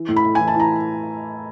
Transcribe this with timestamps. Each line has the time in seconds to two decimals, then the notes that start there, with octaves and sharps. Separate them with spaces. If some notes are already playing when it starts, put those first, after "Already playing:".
Already playing: E3
0.08 A2
0.16 B5
0.24 A2
0.35 E3 G#5
0.48 A5
0.55 E3
0.60 A#5